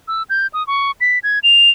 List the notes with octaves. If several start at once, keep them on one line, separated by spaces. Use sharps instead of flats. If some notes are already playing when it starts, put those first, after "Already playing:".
E6
G6
D#6
C#6
B6
G#6
F7